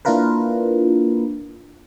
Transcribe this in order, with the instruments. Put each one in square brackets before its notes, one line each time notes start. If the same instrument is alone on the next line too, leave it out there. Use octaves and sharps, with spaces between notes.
[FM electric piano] A#3 D4 E4 F4 A#4 B4